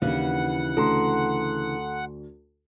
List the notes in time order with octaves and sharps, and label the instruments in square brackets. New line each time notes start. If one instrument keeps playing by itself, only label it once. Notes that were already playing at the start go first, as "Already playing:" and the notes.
[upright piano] D#2 [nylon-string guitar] C#3 E3 D4 [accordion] F#5
[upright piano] D2 [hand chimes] A4 A#5 C6